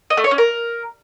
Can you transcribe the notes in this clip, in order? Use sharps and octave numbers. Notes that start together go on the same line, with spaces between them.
D#5
A3
C#5
C#4
A#4